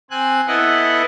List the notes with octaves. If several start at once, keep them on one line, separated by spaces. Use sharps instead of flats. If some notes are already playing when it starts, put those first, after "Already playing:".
C4 G#5 F#6
B3 E4 A4 B4 D#5 F#5